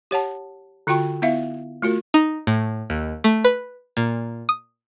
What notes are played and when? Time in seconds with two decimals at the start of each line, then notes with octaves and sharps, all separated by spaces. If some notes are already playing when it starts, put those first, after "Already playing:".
0.11 G4 C#5 F#5 A5
0.87 D3 F4 F#4 G5 C#6
1.22 B3 E4 E5 F5
1.82 A3 F4 F#4 A#4
2.14 D#4
2.47 A2
2.90 D#2
3.24 A3
3.45 B4
3.97 A#2
4.49 D#6